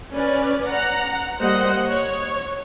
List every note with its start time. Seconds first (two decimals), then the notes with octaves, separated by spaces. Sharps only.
0.14 C#4 B4 D5
0.66 F#5 A#5
1.39 G3 A#3 C5 D#5 F#5
1.86 C#5